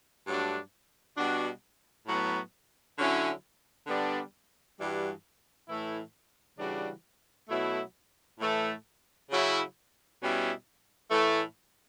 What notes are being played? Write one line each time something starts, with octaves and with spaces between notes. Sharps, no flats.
G2 F#3 A3 D4
B2 G3 D4 F#4
A2 F#3 B3
D3 F#3 C#4 E4
D3 G3 B3 D4
G2 E3 G3 D4 F#4
A2 E3 A3 E4
C#3 E3 G3 D4 F#4
B2 F#3 A3 E4
A2 E3 A3
C#3 F#3 C#4 E4
B2 G3 C#4 E4
A2 E3 A3